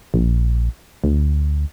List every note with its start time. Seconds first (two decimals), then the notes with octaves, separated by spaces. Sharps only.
0.14 A#1
1.04 D2